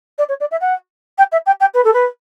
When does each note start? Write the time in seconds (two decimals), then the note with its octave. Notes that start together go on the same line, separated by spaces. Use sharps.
0.18 D5
0.29 C#5
0.40 D5
0.51 E5
0.61 F#5
1.18 G5
1.32 E5
1.46 G5
1.60 G5
1.74 B4
1.84 A4
1.93 B4